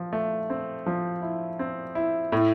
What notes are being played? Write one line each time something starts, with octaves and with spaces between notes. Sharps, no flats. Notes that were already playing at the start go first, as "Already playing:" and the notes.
Already playing: F3
A3
C4
F3
E4
C4
E4
A2